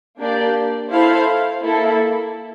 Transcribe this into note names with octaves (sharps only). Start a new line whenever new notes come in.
A#3 D4 G4 D5
E4 A4 C5 F5
A#3 E4 A4